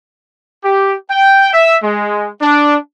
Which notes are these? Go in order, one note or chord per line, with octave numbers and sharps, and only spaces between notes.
G4
G5
E5
G#3
D4